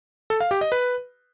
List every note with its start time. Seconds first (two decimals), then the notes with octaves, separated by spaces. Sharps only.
0.30 A4
0.40 F5
0.51 G4
0.61 D#5
0.72 B4